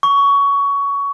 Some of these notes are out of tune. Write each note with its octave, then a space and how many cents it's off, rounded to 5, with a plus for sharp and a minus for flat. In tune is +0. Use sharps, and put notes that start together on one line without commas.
C#6 +20